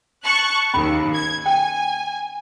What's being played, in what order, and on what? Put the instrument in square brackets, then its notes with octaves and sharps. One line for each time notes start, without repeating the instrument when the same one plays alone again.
[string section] A5 C#6 F#6
[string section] D#2 [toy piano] C#4 B5
[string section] G#6
[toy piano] G5 [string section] G#5